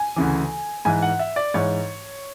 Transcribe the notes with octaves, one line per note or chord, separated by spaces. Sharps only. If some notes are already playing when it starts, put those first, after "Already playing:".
Already playing: G#5
D2 C#3 E3
G#2 E3 G#5
F#5
E5
D5
G#2 E3 C#5